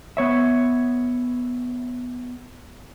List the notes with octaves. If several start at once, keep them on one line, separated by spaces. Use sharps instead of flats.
B3 C#5 E5